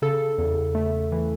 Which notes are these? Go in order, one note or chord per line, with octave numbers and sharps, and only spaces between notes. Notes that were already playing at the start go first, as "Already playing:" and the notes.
C#3 A4
E2
A3
E3